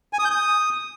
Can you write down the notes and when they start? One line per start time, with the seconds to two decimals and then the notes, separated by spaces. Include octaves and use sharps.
0.13 G#5
0.19 D#6
0.25 G6
0.31 D#6